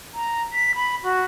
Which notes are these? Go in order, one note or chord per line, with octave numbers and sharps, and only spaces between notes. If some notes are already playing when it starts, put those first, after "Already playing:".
A#5
B6
B5
F#4